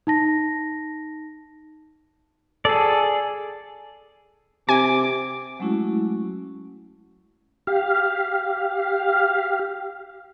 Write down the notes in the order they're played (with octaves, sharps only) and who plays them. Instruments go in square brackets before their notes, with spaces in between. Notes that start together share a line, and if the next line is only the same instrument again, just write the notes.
[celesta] D#4 A5 A#6
[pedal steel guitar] G#4 D5 [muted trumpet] A4
[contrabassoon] C3 [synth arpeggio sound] G#5 [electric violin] D6
[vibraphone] F#3 G#3 A3 C#4 E4 F#4
[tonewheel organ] G4 F5